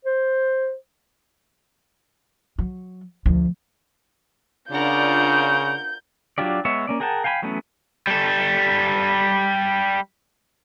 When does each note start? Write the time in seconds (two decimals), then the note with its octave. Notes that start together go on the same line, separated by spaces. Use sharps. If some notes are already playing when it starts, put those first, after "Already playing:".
0.05 C5
2.58 F#3
3.26 D2 F3
4.72 C#3 D4 F4 A#4 D5 F#5 G6
6.38 F#3 D4 F4 G4 D5
6.65 G#3 B3 C#5 E5
6.87 A#3 C#4 D5
7.00 G#4 A#4 F#5 G5 A5
7.24 F5 G5 G#5 A#5 B5
7.42 E3 F#3 A3 B3 C#4
8.07 G3 A4